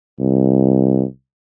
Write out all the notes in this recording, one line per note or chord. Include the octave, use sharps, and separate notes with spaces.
C2